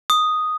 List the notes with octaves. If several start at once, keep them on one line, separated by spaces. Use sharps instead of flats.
D#6